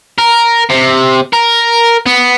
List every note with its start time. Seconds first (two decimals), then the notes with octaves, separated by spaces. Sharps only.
0.18 A#4
0.70 C3
1.33 A#4
2.06 B3